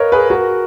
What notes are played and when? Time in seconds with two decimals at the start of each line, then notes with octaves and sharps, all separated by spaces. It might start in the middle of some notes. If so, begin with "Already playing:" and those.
Already playing: A#4 B4 C#5 D#5 F5
0.12 G#4 B4
0.30 F#4 A#4